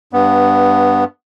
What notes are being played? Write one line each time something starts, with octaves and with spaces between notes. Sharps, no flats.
G2 B3